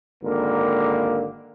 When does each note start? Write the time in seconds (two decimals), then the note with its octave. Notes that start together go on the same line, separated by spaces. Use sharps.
0.24 G#1 D3 A#3